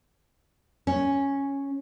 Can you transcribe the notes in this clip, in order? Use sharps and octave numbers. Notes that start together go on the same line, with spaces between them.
C#4